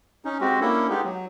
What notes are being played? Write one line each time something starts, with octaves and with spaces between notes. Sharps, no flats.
C#4 D#4
G#3 C4 F#4 G4
A#3 C#4 D4 E4 A4
G#3 B3 D#4 G4
F#3